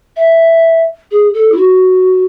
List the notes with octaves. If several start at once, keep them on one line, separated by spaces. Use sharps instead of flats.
E5
G#4
A4
E4
F#4